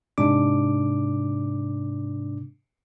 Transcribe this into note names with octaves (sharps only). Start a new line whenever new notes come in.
G#2 C3 D4 D6